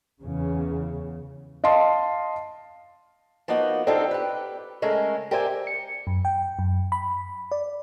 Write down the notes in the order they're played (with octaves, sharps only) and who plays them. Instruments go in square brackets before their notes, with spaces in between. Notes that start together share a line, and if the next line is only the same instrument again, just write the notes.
[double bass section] E2 C#3
[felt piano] D#5 F5 A5 C6
[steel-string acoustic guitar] F3 A#3 B3 D#4 F#4
C4 D4 D#4 F4 G4 A4
G4 B4
C#3 G#3 A3 C#4 A#4
G4 A#4 C5 D5 E5 G#5
[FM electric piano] C#7
F#2
G5
F#2
B5
D5